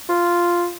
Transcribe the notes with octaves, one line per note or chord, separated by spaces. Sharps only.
F4